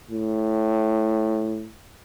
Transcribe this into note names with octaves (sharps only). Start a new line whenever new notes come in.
A2